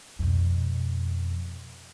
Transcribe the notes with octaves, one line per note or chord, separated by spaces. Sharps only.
F2 B2